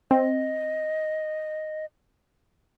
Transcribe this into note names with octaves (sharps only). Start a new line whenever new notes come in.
C4 D#5